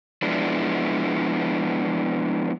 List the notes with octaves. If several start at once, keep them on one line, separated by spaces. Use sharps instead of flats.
F3 G#3 B3 D4 E4